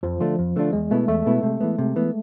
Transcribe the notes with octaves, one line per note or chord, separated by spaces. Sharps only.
F2 F3
D3 A3 D4 F4
F2
D3 A3 D4 F4
E2 G#3
B2 A3 B3 E4
E2 A3
B2 B3 E4
C3
E3 B3
C3
E3 B3